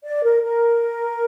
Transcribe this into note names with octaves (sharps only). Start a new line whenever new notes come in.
D5
A#4
A#4